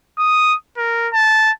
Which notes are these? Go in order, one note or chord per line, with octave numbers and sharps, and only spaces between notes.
D#6
A#4
A5